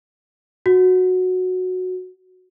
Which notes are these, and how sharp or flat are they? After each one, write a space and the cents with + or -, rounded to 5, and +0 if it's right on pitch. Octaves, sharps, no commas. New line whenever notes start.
F#4 -10